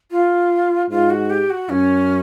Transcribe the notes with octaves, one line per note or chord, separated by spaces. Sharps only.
F4
G#2 F4
F#4
G4
F#4
F#2 C#4